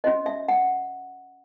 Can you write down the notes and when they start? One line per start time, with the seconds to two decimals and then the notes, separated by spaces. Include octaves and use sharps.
0.04 C#4 F#4 C5 D#5
0.26 E5
0.48 F#5